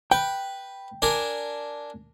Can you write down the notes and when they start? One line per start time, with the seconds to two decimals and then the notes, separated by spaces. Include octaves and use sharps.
0.11 B4 G5
1.02 D4 A#4 G#5